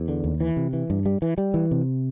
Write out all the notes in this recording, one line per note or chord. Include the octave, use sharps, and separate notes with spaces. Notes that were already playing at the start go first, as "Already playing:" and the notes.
Already playing: E2
D3
D#2
E3
C3
E3
G2
G3
E3
G3
E3
C3